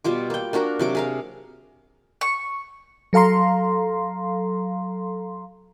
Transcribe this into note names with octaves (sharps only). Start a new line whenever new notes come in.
B2 G3 F4 D6
A#3 G5
A#3 D4 F#4 A#4
C3 F#3 D6
G#4 A#4 F5
C#6
F#3 A4 F5 A#5 C6